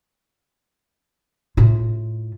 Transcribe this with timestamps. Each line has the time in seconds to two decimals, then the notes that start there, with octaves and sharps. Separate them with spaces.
1.57 A2 F4